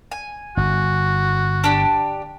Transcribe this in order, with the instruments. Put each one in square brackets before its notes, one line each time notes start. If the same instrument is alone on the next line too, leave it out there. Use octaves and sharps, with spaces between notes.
[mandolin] G#5
[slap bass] G1 [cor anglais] F#4
[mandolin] D4 G4